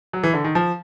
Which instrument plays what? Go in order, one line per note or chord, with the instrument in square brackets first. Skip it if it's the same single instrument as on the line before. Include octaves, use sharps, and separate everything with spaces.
[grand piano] F#3
E3
D3
D#3
F3